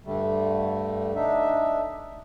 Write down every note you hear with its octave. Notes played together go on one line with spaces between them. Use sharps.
G2 D3 G3 A3
D4 D#4 E5